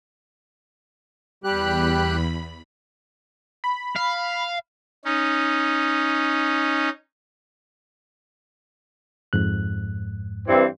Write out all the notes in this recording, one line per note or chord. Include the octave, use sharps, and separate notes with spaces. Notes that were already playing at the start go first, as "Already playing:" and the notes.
E2 G3 G4 B5 F#6
B5
F5
C#4 D#4
F2 G#2 F#6
G2 E3 C4